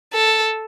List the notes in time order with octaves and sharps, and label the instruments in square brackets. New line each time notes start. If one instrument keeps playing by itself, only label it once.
[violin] A4